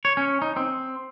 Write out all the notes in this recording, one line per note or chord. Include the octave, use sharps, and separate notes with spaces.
C#5
C#4
D#4
C4